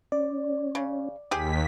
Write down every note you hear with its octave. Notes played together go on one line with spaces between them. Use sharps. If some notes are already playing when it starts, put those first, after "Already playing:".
C#4 D5
C#3
D#2 G4 G#4 B6